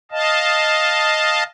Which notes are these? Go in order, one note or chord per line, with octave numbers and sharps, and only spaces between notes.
D#5 F5 A5